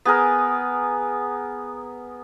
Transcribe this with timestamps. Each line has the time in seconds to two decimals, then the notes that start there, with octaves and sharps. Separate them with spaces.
0.05 B3 G#4 A#4